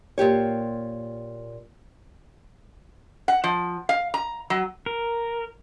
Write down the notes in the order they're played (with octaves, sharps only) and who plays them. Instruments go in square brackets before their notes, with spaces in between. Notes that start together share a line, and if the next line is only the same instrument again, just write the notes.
[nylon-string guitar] A#2 F4 G4 C#5
[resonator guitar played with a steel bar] F#5
F3
F5
A#5
F#3
[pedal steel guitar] A#4